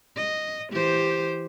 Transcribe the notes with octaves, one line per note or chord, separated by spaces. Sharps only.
D#5
E3 G4 C5